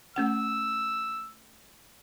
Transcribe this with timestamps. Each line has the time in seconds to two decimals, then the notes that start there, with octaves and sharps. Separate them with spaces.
0.16 A3 C#4 F#5 E6